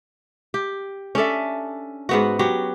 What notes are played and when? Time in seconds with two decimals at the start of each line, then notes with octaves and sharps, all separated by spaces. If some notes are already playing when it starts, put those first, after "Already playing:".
0.54 G4
1.15 C#4 D4 A4 E5
2.09 G#2 B3 F#4
2.39 F#3 F#4 G4